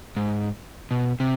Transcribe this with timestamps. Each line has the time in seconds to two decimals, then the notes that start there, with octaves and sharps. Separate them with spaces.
0.17 G#2
0.91 B2
1.20 C3